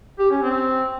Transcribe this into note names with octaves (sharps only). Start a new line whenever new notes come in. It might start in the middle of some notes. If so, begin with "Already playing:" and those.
G4
C#4
C4